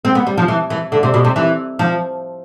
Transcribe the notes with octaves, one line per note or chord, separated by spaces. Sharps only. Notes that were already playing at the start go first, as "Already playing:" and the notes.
C4
B3
G3
F3
E3
E3
D3
C3
B2
C3
E3
F3